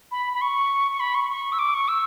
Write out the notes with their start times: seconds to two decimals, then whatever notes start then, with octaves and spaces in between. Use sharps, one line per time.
0.12 B5
0.33 B5
0.41 C#6
0.92 C#6
1.00 B5
1.15 C#6
1.30 C#6
1.52 E6
1.59 D6
1.74 C#6
1.88 E6